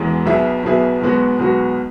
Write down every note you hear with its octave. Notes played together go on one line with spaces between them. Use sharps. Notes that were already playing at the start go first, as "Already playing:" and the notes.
Already playing: E1 E2 E3 G#3
B1 B2 B3 G#4 E5
B1 B2 B3 G#4 E5
B1 B2 G#3 B3 F#4
B1 B2 G#3 B3 F#4